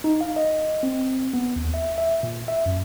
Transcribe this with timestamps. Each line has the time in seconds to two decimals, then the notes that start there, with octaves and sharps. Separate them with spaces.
0.04 D#4
0.21 F5
0.36 D#5
0.83 C4
1.34 B3
1.56 D#2
1.74 E5
1.98 E5
2.23 A#2
2.48 E5
2.66 F#2